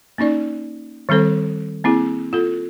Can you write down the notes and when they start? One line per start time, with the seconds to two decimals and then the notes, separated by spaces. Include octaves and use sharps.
0.18 A#3 C#4 D#4 D5
1.09 D#3 G3 C4 A4 C5
1.84 A#3 C4 E4 G#4
2.33 F4 A4